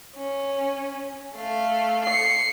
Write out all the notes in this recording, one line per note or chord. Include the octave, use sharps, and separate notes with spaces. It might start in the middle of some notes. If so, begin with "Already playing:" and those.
C#4
A3 F5
C7 C#7